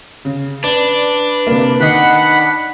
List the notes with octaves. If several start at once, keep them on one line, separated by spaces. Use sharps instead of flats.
C#3
D4 B4 D5
C3 A#3
D#3 D#5 F#5 B5 C7